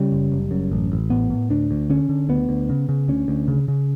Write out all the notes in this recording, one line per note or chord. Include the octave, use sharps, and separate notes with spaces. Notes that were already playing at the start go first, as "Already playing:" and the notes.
Already playing: C#3 G3
F#1
F#1
F#2
A1
A1
A2 B3
A2
D2 D4
D2
D3 C#4
D3
D2 B3
D2
C#3
C#3
D2 C#4
D2
C#3
C#3